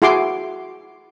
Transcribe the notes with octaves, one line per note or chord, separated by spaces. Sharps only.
E4 F#4 G#4 C6 D6